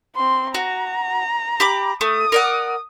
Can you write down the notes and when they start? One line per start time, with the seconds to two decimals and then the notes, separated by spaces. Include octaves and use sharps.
0.16 C4 C6
0.54 F#4 A#5
1.60 G4 B5 D6
2.01 A3 D#6
2.32 A#4 D5 F#5